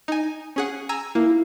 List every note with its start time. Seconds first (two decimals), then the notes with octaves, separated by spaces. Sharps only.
0.08 D#4 G#5
0.56 C#4 G#4 F#5
0.89 G#5 A#5 E6
1.15 A#3 E4